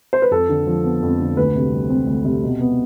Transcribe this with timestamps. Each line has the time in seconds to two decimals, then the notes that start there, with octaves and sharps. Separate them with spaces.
0.13 C5
0.22 B4
0.31 F2 A4
0.49 D3
0.67 F3
0.84 B3
1.02 F2
1.20 D3
1.37 D2 B4
1.55 C3
1.72 G3
1.90 C4
2.07 D2
2.25 C3
2.43 B2
2.60 B3